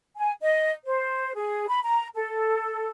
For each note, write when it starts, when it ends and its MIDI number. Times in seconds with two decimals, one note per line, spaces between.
0.17 0.32 80
0.42 0.71 75
0.85 1.35 72
1.36 1.66 68
1.68 1.80 83
1.83 2.07 82
2.15 2.91 69